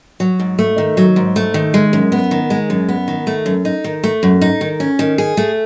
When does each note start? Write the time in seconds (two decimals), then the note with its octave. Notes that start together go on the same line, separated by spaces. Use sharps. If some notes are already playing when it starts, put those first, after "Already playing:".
0.20 F#3
0.40 G#2
0.59 A3
0.78 D#3
0.97 F#3
1.16 G#2
1.36 A3
1.54 D#3
1.74 G#3
1.93 F#2
2.12 B3
2.31 D#3
2.50 G#3
2.70 F#2
2.89 B3
3.08 D#3
3.27 A3
3.46 F#2
3.65 D#4
3.84 D#3
4.04 A3
4.23 F#2
4.41 D#4
4.61 D#3
4.80 C#4
4.99 D#3
5.18 G#4
5.37 A3